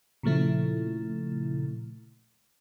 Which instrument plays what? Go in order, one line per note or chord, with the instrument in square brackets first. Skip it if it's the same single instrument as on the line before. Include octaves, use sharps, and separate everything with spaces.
[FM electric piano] A#2 C#3 F3 A3 E4